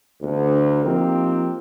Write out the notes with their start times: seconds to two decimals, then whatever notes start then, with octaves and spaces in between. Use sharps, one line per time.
0.21 D2
0.84 F3 A#3 C4 D#4 G4 A#4